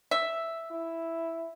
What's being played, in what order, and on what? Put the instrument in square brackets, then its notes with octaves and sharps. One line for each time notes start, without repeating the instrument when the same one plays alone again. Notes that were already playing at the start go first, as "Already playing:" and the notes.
[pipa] E5
[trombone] E4